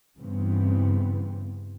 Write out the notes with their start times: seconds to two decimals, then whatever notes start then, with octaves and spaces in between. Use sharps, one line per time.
0.18 G2 C#3 E3 B3 C4